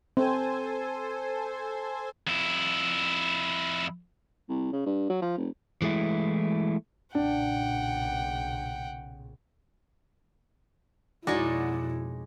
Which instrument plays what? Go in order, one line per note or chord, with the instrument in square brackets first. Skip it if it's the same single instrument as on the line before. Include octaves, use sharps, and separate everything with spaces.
[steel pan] C4 [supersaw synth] A4 C5 G#5
[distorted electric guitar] F2 E4
[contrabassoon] C2
C#3
G2
F#3
F3
F1
[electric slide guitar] E3 G#3 A3 E4
[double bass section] B1 A#2 C#3 [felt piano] D4 [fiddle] F#5 G5
[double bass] F2 B2 [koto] G#3 D#4 C#5 [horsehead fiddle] E4 [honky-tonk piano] F#4 D5